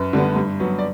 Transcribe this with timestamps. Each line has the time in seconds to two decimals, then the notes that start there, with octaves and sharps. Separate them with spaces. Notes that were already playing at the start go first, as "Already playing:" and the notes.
Already playing: F#2 B4
0.13 D3 G3 B3
0.36 G2
0.60 F#3 B3
0.79 D5